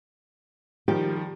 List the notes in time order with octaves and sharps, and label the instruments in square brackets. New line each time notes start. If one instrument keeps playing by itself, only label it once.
[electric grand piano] D#3 F3 G3 [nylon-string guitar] G4